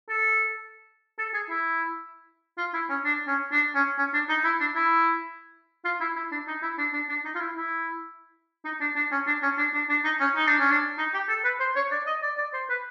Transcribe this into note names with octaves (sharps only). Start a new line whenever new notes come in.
A4
A4
G#4
E4
F4
E4
C#4
D4
C#4
D4
C#4
C#4
D4
D#4
E4
D4
E4
F4
E4
E4
D4
D#4
E4
D4
D4
D4
D#4
F4
E4
E4
D#4
D4
D4
C#4
D4
C#4
D4
D4
D4
D#4
C#4
D#4
D4
C#4
D4
D#4
G4
A4
B4
C5
C#5
D5
D#5
D5
D5
C5
B4